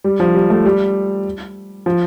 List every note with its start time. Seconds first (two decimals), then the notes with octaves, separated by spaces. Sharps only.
0.04 G3
0.20 F3
0.35 G3
0.50 A3
0.65 G3
1.86 F3